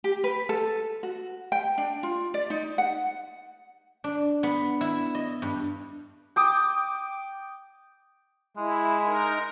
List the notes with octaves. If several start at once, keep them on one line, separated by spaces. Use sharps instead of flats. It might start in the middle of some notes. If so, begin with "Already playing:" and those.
G4
B4
A4
F#4
G5
D4
F4
D5
D#4
F#5
D4
B3
E4
D#5
G2
G5 D6 D#6
G#3 E4
D#4 A#4